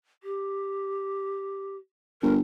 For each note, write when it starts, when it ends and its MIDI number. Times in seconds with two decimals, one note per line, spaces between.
0.23 1.76 67
2.22 2.40 31
2.22 2.34 70